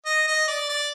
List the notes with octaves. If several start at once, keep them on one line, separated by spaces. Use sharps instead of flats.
D#5
D#5
D5
D5